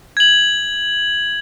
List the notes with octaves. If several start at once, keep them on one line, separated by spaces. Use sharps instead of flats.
G#6 F#7